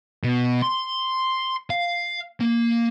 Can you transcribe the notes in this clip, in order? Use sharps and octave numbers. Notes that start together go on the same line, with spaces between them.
B2
C6
F5
A#3